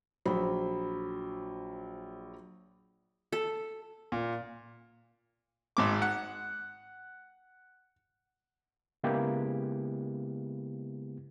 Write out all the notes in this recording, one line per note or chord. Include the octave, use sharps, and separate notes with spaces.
A#1 F#3 C5 B5
A4
A#2
G#1 G#2 D6
F#5
C#3 G#3 A#3 B3 E4 G4